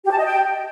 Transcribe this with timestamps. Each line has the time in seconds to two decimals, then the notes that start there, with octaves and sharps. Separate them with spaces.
0.04 G4
0.11 A5
0.18 D#5
0.24 G5